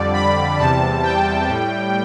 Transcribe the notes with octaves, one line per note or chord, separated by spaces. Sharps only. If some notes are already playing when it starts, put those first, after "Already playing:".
Already playing: F2 D3 G3 D5
B5
E2 C3 G3 A5
G5
A2 G3